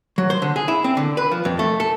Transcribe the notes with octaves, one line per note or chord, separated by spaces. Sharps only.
F#3
C5
D3
G#4
E4
C4
D3
B4
F3
F2
A3
A4